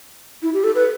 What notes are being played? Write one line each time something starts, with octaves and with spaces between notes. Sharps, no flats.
E4
G4
A4
B4